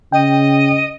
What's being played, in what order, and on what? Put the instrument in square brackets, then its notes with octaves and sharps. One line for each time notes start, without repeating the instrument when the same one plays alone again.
[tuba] C#3 [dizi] D#5 [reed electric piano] G5